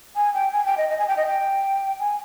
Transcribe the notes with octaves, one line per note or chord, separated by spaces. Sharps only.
G#5
G5
G#5
G5
D#5
D#5
G#5
G5
D#5
G5
G#5